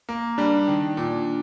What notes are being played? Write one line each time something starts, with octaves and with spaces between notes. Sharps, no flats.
A#3
G3 D4
D#3
A#2